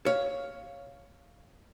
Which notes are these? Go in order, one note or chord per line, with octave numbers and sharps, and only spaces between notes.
C#5 F5